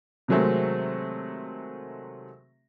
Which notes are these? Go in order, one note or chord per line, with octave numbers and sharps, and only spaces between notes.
C3 D#3 F#3 G#3 A3 C4